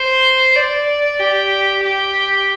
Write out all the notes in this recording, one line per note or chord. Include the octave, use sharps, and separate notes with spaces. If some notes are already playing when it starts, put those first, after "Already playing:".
Already playing: C5
D5
G4
G4